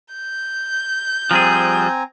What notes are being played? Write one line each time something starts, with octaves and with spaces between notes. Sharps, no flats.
G6
F3 G3 C4 G#4 G#5 A#5